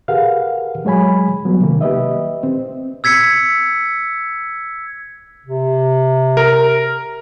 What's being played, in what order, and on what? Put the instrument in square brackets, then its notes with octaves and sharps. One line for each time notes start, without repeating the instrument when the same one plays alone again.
[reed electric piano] G4 G#4 A#4 B4 F5 F#5
F#3 G#3 C#5 G#5 B5
F#3 G3 B3
C3 D#3 A#3
G4 B4 D#5 E5
C4
[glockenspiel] E6 G#6 B6 C#7
[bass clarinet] C3
[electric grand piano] A#4